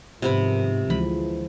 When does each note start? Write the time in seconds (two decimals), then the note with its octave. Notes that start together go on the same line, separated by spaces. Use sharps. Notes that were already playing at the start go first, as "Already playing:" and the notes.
0.22 G#2 C3 D#3 F3 B3 B5
0.90 D2 E3 F3 G#3 B5